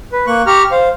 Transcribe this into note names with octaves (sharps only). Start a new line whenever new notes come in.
B4
A#3 C#6 F#6
G4 A#5 C#6 F6
C5 F5